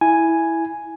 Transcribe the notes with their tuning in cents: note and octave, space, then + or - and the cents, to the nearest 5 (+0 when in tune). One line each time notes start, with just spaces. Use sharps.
E4 -5 G#5 +0